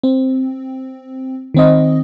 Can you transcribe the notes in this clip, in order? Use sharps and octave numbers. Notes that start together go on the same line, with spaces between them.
C4
D#3 C4 D#5